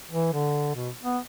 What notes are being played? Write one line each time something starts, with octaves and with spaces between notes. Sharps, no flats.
E3
D3
B2
B3